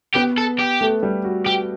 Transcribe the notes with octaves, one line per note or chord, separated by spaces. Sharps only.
B3 G4 B4
A4
G4
A3 A4
G3 G4
F#4
G4